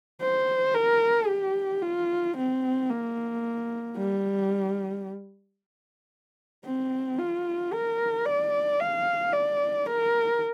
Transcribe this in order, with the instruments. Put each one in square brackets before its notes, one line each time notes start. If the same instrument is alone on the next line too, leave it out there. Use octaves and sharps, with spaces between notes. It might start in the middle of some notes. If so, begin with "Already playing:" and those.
[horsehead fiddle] C5
A#4
G4
F4
C4
A#3
G3
C4
F4
A#4
D5
F5
D5
A#4